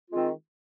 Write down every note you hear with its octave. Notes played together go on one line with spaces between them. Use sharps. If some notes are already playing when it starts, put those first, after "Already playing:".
D#3 G#3 C4 F4